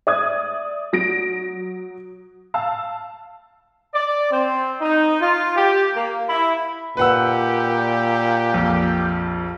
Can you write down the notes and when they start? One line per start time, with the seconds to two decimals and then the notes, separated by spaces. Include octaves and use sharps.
0.07 D5 E5 D#6 G#6
0.93 F#3 A#6 D7
2.54 F5 A5 E6
3.94 D5
4.31 C4
4.81 D#4
5.20 F4
5.56 G4
5.94 A#3
6.29 E4
6.97 A#2 G4 B4 F#5 E6
8.54 A#1 F2